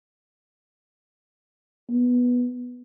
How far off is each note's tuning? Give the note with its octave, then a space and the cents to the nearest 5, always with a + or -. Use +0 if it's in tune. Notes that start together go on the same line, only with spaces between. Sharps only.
B3 -5